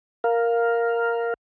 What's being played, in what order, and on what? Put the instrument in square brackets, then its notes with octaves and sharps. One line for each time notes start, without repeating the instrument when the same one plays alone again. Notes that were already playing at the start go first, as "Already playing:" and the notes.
[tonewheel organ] A#4 F5